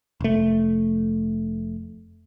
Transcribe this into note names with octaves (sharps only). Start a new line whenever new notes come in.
F1 A3